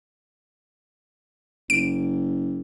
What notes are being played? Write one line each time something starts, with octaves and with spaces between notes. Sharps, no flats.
F#1 D7